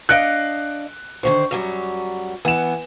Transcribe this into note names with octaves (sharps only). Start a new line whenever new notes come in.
D4 D#5 F5 F#6 C#7 D7
D3 D#3 C5 C#6
F#2 F#3 G3
E3 B3 F#5 E7